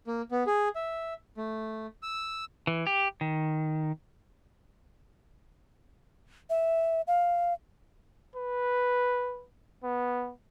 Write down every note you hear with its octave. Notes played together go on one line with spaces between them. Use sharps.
A#3
B3
G#4
E5
A3
E6
E3
G4
D#3
E5
F5
B4
B3